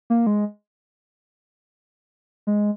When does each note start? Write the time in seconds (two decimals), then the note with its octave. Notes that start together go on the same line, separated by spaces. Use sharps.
0.10 A#3
0.27 G#3
2.47 G#3